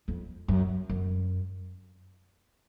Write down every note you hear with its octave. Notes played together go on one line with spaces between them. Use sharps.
F2
F#2
F#2